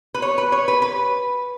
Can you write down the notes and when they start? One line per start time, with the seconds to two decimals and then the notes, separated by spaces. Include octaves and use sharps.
0.14 B4
0.22 C#5
0.38 B4
0.52 C#5
0.68 B4
0.82 B4